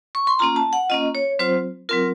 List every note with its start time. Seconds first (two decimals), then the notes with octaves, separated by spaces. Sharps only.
0.15 C#6
0.27 C6
0.39 A#3 C#4 F4 A#5
0.56 A5
0.73 F#5
0.90 A#3 C#4 F4 D#5
1.15 C#5
1.39 F#3 C4 F4 C5
1.89 F#3 C4 F4 A#4